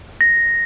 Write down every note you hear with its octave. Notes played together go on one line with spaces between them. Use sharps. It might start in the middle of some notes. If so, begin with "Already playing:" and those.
A#6